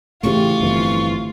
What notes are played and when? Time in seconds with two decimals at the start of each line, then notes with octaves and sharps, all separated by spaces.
0.23 A2 C#3 E3 A3 F4 G4 C#6
0.61 G1 F2 E3